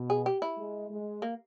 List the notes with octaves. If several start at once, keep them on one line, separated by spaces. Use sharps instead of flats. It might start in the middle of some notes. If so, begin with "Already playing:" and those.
Already playing: B2
G#4
G4
E4
G#3
G#3
A#3